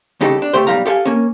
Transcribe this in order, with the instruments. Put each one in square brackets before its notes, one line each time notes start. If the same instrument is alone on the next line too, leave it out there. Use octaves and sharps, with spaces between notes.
[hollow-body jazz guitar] C2 C#3 D#4 G4 A4
D4
C#2 A3 G4 C5
B1 G2 E3 G3 F5 A#5
G4 A4 E5 F5 G#5
A#3 C#4